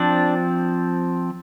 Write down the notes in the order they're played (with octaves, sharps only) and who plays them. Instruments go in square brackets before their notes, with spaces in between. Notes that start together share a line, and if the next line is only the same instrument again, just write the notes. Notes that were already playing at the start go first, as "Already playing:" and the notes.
Already playing: [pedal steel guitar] F3 C4 D4